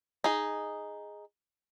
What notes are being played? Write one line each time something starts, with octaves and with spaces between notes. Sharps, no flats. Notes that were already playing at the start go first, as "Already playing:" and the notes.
D#4 G#4